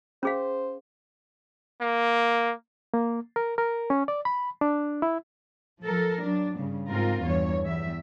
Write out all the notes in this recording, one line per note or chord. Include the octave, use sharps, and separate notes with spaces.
C#4 G#4 C5 F5
A#3
A#3
A#4
A#4
C#4
D5
B5
D4
E4
F3 A4 A#4
F#3 D4
G2 C#3
G#2 C4 F4 A#4
E2 G2 C#5
E2 G3 E5